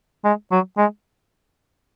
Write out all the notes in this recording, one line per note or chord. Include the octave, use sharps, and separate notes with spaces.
G#3
F#3
G#3